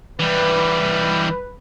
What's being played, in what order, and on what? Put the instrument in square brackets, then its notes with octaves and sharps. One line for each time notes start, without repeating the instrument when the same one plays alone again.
[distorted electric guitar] E3 G3 [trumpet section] B4